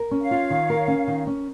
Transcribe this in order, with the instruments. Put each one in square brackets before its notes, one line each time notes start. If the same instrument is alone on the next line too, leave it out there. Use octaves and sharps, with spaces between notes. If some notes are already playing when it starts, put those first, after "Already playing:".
Already playing: [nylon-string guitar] A#4
C#4
[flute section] C#5 F5
[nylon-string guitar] F4
D#3
A#4
C#4
D#3
C#4